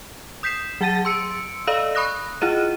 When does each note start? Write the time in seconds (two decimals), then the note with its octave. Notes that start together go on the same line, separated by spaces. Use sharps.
0.43 D#6 G6 B6 C7 E7
0.81 F#3 G#4 F#5 A5 A6 D#7
1.05 C6 E6 C#7 D7
1.67 A4 D5 D#5 F5 E6
1.95 B5 C#6 D#6 F#6 A#6
2.41 E4 F4 G#4 D#5 D#7